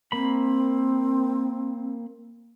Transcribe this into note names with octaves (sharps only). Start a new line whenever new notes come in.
A#3 C4 B5